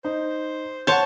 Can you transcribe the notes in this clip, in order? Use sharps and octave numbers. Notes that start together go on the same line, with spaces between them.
D#4 C5
C#5 F#5 A5 C6 G6